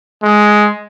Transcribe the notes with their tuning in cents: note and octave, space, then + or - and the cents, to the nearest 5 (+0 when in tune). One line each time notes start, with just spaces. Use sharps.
G#3 +10